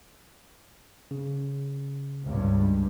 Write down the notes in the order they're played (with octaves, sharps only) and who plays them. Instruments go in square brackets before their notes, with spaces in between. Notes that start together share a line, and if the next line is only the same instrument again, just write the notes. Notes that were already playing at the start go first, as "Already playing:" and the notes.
[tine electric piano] C#3
[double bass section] C#2 G2